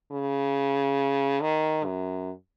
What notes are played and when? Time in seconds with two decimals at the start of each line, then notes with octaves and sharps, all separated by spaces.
0.12 C#3
1.42 D#3
1.85 F#2